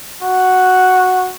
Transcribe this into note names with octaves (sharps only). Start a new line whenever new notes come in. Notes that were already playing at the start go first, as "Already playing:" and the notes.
F#4